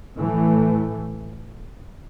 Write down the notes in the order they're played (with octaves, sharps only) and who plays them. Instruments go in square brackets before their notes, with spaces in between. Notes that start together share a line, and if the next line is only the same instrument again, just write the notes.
[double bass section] A2 E3 A3